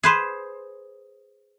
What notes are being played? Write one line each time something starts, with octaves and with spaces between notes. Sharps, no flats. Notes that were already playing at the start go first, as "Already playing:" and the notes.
G#4 B4 C5